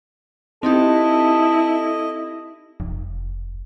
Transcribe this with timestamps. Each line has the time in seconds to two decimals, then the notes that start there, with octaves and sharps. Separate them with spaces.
0.63 C4 D#4 E4 G4 A4 D#5
2.80 F1